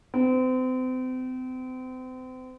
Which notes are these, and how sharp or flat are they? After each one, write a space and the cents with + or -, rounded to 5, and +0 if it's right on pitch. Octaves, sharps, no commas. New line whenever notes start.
C4 -35